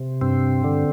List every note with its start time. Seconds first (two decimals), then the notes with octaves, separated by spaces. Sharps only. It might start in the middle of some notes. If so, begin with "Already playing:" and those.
Already playing: C3
0.21 G2 C4
0.64 D3